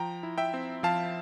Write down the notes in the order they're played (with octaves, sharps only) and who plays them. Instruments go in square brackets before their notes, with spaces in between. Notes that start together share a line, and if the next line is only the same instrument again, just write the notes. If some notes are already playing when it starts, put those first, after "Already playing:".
Already playing: [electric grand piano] F3 G5 A#5
E4
E5 G5
C4
F3 F5 A5